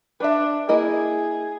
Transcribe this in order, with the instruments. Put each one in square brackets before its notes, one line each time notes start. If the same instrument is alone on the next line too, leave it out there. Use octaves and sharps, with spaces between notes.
[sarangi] D4 [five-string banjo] B4 E5
[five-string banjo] A#3 E4 D#5 [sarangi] G#4